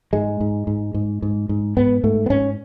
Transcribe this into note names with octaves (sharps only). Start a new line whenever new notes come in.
G#2 G#3
G#2
G#2
G#2
G#2
G#2
G#2 B3
G#2 A3
B3
G#2 C#4